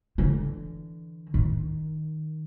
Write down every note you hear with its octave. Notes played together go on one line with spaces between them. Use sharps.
D3 E3
D#3